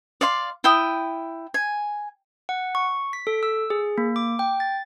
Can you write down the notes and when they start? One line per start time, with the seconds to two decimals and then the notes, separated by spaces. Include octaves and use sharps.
0.21 D5 F5 C6
0.64 E4 G5 D#6
1.54 G#5
2.49 F#5
2.75 C#6
3.13 B6
3.27 A4
3.43 E6
3.70 G#4
3.98 A#3
4.16 D6
4.39 G5
4.60 A6